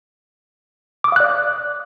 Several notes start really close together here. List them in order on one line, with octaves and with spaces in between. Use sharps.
D6 D#6 F5 F#6 D5